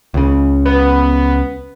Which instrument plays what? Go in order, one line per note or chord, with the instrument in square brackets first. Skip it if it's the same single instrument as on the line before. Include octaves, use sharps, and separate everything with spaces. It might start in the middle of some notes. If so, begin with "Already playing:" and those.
[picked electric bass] C#2 C#3
[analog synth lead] B3